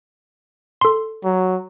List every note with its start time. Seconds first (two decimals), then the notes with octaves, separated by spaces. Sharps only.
0.81 A4 C6
1.24 F#3